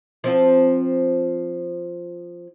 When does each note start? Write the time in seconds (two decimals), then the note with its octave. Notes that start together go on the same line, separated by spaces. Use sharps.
0.24 F3 C4 F4